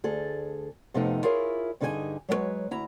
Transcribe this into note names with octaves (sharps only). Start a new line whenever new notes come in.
D2 G#4 A4
F2 C3 F3 A3 B3 D#4
E4 F4 G#4 A#4 C#5
G2 D3 D#4 G#4 A#4 G#5
F#3 G#3 B3 B4 C#5
D2 E4 A#5